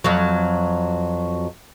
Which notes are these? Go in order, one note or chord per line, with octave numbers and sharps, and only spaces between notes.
F2 F#3